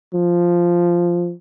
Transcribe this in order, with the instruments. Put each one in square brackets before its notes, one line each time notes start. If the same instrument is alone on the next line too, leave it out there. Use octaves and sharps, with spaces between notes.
[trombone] F3